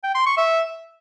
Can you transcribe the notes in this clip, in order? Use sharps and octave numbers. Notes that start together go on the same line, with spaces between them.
G5
C6
C#6
E5